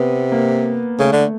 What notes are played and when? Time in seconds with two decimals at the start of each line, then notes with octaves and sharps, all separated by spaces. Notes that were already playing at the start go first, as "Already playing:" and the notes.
Already playing: C3 B3
0.32 A#3
0.99 C#3 A3
1.12 D3